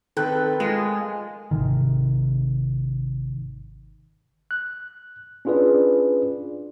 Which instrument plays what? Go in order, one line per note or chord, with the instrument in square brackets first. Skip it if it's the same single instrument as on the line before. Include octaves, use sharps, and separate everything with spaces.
[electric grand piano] D#3 C4 [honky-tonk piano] A4 G5 F#6 [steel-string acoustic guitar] B4
[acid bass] G#3 [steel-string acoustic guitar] F4 [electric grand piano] G#4 A#4
[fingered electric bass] G#1 C#2 C3 D#3
[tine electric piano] F#6
C#4 D4 F4 G#4 B4 D5